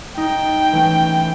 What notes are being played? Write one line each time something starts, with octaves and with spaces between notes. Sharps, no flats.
D#4 G5
E3 A3 C#4